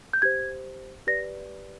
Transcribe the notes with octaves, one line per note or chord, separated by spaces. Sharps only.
G6
G4 C5 G#6
G4 B4 D5 A#6